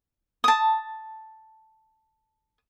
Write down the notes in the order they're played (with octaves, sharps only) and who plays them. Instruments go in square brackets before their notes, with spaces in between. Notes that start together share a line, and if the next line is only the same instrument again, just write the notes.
[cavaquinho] A5 D#6